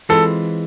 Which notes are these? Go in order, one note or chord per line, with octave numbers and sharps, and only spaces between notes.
E3 G#3 C4 F4 A4